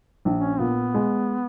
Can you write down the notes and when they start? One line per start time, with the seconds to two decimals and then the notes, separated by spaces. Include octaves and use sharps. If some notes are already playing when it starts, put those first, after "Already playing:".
0.25 A#1
0.36 C#4
0.59 A#2 B3
0.94 G#3